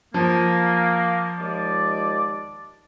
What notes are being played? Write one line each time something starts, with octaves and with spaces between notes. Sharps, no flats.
F3 A#3
D#2 G#3 D5